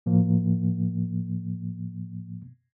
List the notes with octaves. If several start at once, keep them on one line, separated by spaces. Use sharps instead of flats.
A2 F3 A#3